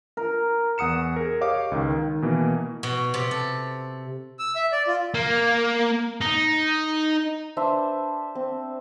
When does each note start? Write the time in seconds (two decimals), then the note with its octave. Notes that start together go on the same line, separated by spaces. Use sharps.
0.17 A#4
0.78 E2 F#5 D#6 C#7 E7
1.16 G#4 A#4
1.41 G4 C#5 D#5 F5 D6
1.72 C#2 D#3
1.98 D#3
2.22 B2 E3 A#3
2.83 B2
3.14 C3
3.31 A4
4.39 E6
4.55 E5
4.72 D5
4.87 F4
5.14 A#3
6.21 D#4
7.57 D4 B4 C5 E5
8.35 C4